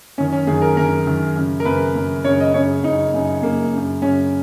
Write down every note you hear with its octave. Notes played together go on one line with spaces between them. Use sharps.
F#2 D#3 C#4
C#4
F#2 D#3 G#4
A#4
F#2 D#3 A#4
F#2 D#3
F#2 C#3
A#4
F#2 C#3 B4
F#2 C#3
F#2 C#3 C#5
D#5
F#2 C#3 C#5
F#2 C#3 D#4
F#2 C#3
F#2 C#3 A#3
F#2 C#3
F#2 C#3 C#4